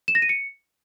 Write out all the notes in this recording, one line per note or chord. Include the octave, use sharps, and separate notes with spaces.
E7
A#6
D#7
C#7